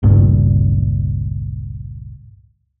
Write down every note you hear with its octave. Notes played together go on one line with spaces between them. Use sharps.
G1 C#2 G2 A#2